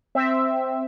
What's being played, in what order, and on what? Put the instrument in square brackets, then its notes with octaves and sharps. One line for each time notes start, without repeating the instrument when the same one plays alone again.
[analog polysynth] C4 E5